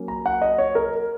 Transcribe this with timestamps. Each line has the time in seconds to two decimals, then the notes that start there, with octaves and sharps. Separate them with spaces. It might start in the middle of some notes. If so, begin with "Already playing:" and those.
Already playing: F#3 A#3 C#4
0.08 A#5
0.26 F#5
0.42 D#5
0.58 C#5
0.75 A#4